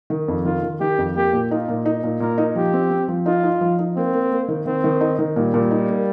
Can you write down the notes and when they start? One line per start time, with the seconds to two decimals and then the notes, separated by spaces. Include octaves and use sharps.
0.10 D#3
0.28 F2
0.45 D#3 F4
0.63 D#3
0.80 D#3 G4
0.98 F2
1.16 A#3 G4
1.33 A#2
1.51 D#4 F4
1.68 A#2
1.86 D#4
2.03 A#2
2.20 A#2 A#4
2.38 D#4
2.55 F3 G4
2.73 C4
2.90 C4
3.08 F3
3.26 D#4 F4
3.43 D#4
3.61 F3
3.79 D#4
3.96 A#3 C4
4.13 A#3
4.32 A#3
4.48 D#3
4.66 D#3 C4
4.84 D#3
5.01 D#4
5.19 D#3
5.36 A#2 G3
5.54 A#2
5.71 D#4
5.88 A#3